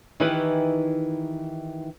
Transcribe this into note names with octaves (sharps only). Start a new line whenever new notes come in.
D#3 E3 D#4 E4 G4 B4